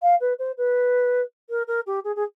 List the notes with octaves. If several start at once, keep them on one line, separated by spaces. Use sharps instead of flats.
F5
B4
C5
B4
A#4
A#4
G4
G#4
G#4